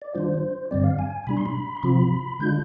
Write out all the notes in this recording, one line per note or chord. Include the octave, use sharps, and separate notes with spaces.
D5
D#3 G3 D4 F4 C5
G2 D3 G3 C4 D5
F5
G#5
B2 G3 D4 B5
C6
B5
C6
C3 F3 C4 F4 B5
D3 G#3 D4 F4 G6